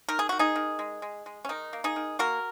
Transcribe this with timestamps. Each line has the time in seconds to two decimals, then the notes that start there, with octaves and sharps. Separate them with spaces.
0.09 D#3 A#4
0.19 G#4
0.29 D#3 F#4
0.39 D#4 G#4
0.56 D#3
0.79 G#3
1.02 G#3
1.26 G#3
1.45 C#4
1.49 D#3 D#4
1.73 A#3
1.84 D#4 G#4
1.96 D#3
2.19 A#3 F#4 A#4